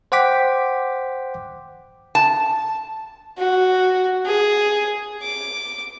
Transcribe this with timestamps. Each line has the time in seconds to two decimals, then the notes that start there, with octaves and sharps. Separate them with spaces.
0.12 C5 F#5 G5 D6 B6
2.15 A5
3.38 F#4
4.25 G#4
5.23 D6